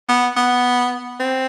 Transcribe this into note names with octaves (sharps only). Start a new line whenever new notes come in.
B3
B3
C4